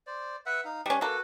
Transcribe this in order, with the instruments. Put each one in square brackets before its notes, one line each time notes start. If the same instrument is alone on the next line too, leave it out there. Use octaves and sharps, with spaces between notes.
[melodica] C5 D5
B4 E5 F#5
D#4 F5
[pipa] G3 C#4 [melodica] D4
[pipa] A#3 A4 [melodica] F#4 B4